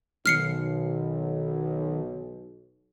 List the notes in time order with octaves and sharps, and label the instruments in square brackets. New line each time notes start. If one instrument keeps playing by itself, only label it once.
[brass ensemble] B1 [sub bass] D#3 [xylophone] F6 C7 C#7